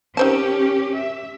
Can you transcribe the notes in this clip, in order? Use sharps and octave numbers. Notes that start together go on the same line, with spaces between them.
D#3 C4 C#4 G4 A5
E5